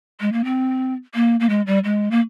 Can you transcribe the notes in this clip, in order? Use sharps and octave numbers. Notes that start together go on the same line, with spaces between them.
G#3
A#3
C4
A#3
A#3
G#3
G3
G#3
A#3